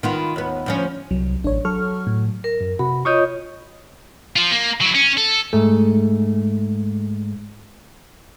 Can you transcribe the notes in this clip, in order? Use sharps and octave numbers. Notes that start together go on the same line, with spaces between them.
D#3 B3 F4
D#2 B3
D2 F3 C#4
C2 F#3
A1 D4 C#5
F#3 A4 C#6 F6
A2
A#4
F#2
C3 F#4 B5
F4 C#5 D#5 C#6 D#6 G6
F3 F4
A#3
F#3 E4
C#4
A4
G#2 A3